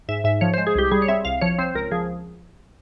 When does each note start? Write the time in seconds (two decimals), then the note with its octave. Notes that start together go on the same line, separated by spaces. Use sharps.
0.09 G#2 E5
0.24 G#2 E5
0.41 F3 C#5
0.54 G#3 C5
0.67 G#4
0.75 C2 G4
0.91 G3 G#4
1.02 C#5
1.08 C4 E5
1.25 C2 F5
1.41 F3 C#5
1.58 C4 C5
1.75 C#2 A#4
1.91 F3 G#4